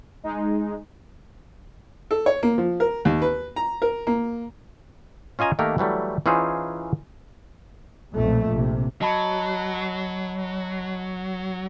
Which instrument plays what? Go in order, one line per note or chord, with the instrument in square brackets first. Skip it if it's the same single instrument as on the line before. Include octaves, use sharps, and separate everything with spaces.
[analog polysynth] G#3 D#4
[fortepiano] A4
C#5
A#3
F3
A#4
D#2
B4
A#5
A#4
A#3
[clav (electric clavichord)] C#4 F4 D#5 G#5 A#5
D#3 A3 A#3 G4 A#4
E3 F#3 G3 A3
E3 C#4 D#4 F4 G#4 C5
[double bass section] B1 F2 A#2 F3 A3
A#1 C3
[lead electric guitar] F#3 [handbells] D#5 A5 B5